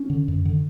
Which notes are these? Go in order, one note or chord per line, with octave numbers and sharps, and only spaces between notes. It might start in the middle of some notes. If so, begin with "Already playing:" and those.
Already playing: C#4
D3
F#2
D3